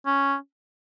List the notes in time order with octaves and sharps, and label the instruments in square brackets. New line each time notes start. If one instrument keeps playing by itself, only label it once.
[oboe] C#4